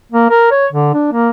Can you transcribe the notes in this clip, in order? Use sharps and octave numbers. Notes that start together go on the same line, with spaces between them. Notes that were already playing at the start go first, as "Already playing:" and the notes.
A#3
A#4
C#5
D3
D4
A#3